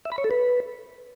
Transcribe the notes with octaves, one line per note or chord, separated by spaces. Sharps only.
E5
B5
C#5
A4
B4